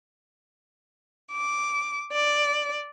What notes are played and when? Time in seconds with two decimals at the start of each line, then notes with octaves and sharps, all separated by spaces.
1.32 D6
2.12 D5